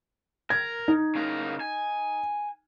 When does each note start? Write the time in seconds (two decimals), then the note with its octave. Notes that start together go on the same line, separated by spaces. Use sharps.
0.50 A#4 G#6
0.88 D#4
1.15 C#3 A#4
1.60 G#5